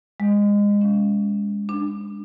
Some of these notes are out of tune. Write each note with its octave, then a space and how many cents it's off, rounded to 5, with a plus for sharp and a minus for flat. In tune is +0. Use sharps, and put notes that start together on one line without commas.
G#3 -25
C#4 +20
D4 +10